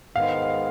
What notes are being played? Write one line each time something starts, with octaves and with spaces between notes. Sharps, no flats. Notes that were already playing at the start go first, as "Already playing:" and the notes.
G#2 D#3 G#3 B3 F5